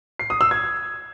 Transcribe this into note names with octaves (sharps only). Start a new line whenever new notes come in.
C7
D#6
E6
G#6